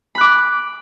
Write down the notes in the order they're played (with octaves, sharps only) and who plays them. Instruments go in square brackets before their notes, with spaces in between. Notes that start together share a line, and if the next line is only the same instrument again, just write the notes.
[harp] B5
F#6
D6